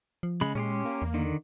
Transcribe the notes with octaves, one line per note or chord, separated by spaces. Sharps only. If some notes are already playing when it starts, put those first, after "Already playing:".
F3
C#3 G#3 B5
A#2 G#3 C#4 G4 C6
A#3
E2
D3 D#3